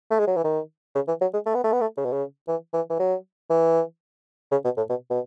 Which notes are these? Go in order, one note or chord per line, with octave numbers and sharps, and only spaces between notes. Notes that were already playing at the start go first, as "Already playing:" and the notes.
A3
G#3
F#3
E3
D#3
C#3
E3
F#3
G#3
A3
B3
A3
B3
A3
C#3
B2
C#3
E3
E3
E3
F#3
E3
C#3
B2
A2
B2
B2